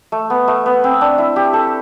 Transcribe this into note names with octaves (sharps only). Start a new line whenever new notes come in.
A3
B3
A3
B3
C4
D4
E4
G4
A4